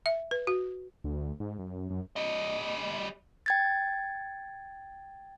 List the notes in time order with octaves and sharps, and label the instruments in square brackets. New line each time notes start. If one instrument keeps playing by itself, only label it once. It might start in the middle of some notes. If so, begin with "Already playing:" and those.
[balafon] E5
B4
F#4
[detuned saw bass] D2
G#2
F#2
F#2
[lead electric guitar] G3 D#5
[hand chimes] G5 G#6 A6